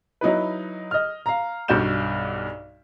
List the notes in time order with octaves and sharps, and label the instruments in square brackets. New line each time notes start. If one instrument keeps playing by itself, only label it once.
[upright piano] F#3 D#4 E4 B4
D#5 F6
F5 A#5
B1 G2 F#4 D5 G6 E7